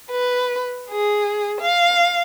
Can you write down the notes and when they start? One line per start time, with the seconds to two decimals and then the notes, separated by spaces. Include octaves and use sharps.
0.11 B4
0.90 G#4
1.61 F5